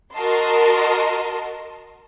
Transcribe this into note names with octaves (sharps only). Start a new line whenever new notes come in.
F#4 A#4 D#5 A5 C6